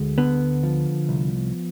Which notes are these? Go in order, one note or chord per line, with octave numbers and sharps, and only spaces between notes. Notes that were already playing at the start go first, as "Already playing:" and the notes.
Already playing: D2 G#3
D3 B3
F3
C2